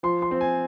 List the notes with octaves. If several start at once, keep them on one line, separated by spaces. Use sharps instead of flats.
F3 C6
C6
C4
G#5